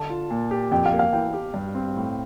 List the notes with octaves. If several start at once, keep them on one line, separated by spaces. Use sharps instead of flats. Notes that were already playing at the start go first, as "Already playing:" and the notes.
Already playing: D3 A5
F4
A#2
G4
F2 G5
F5
A#3
F5
E3 G5
G4
G2
C4
A2